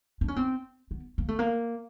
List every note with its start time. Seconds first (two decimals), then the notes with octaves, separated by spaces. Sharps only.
0.21 D4
0.28 C#4
0.36 C4
0.91 B3
1.18 A#3
1.28 A3
1.39 A#3